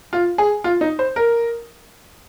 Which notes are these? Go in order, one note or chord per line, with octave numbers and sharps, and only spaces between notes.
F4
G#4
F4
D#4
C5
A#4